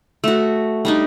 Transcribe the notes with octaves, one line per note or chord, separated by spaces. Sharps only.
A3 F#4
G3 D4 D#4